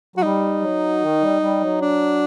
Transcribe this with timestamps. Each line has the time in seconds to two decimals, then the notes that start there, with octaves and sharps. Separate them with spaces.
0.16 F#3 F#4
0.23 G3 D#4
0.62 F#3
1.02 D#3
1.22 G3
1.41 G3
1.61 F#3
1.81 D4